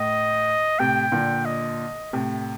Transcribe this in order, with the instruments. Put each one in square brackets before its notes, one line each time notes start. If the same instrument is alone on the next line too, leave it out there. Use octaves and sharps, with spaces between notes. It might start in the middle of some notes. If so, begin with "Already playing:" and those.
Already playing: [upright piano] A2 [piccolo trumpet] D#5
[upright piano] A2 C3 [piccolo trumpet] G5
[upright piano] A#2 D3
[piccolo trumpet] D#5
[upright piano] A2 C3